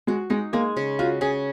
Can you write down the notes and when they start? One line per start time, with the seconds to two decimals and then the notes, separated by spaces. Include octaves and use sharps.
0.07 G#3 F#4
0.30 G#3 D#4
0.53 G#3 A#3
0.77 C#3
0.99 F4 F#4
1.21 C#3 G#4